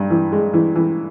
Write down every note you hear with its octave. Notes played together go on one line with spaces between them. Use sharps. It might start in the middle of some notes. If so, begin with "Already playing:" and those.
Already playing: G2
E3
G#3
E3
E3